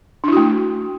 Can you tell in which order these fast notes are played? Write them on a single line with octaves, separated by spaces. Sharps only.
D4 E4 F#4 A3